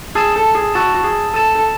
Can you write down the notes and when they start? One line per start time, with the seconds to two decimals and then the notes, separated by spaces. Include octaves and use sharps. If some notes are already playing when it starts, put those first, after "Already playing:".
0.15 G#4 A5 E6 A6 E7
0.36 A4
0.55 G#4
0.74 F#4 A5 E6 A6 E7
0.95 F#4
1.04 G#4
1.34 A4 A5 E6 A6 E7
1.55 A4